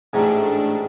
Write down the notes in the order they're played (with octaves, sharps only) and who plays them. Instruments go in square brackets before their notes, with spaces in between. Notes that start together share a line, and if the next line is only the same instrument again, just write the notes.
[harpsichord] A1 G#2 [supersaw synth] A3 D4